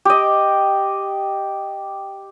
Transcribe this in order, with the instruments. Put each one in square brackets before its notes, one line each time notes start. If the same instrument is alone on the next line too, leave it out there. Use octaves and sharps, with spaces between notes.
[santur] G4 D#5